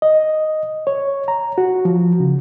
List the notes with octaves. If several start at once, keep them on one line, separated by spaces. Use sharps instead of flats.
D#5
C#5
A#5
F#4
F3
C#3